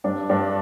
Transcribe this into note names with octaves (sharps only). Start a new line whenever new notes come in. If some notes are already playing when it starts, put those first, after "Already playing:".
G2 D4
G2 D4